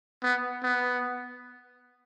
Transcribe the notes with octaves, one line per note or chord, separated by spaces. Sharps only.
B3
B3